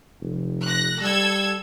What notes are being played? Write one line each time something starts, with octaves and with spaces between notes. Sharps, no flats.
F1
F#6 A#6
G3 A4 E6 G#6